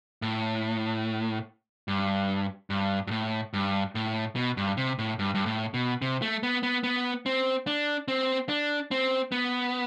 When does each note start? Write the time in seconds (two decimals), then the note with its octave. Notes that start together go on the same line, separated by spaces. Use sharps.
0.22 A2
1.88 G2
2.70 G2
3.07 G2
3.11 A2
3.53 G2
3.95 A2
4.36 B2
4.57 G2
4.77 C3
4.99 A2
5.19 G2
5.35 G2
5.46 A2
5.74 B2
6.02 C3
6.22 A3
6.43 B3
6.63 B3
6.84 B3
7.26 C4
7.67 D4
8.08 C4
8.49 D4
8.91 C4
9.32 B3